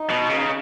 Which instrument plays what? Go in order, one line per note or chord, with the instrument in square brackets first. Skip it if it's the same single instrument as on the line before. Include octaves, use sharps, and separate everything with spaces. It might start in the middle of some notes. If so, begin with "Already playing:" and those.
Already playing: [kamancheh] D#4
[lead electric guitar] B2
C#3